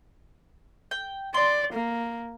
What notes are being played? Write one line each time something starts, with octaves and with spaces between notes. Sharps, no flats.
G5
D5 C6
A#3